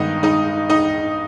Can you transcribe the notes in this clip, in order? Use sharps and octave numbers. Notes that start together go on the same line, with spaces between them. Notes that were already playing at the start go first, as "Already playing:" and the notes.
Already playing: G2 D#3 G#3 B3 D#4 D#5
D#4 D#5
D#4 D#5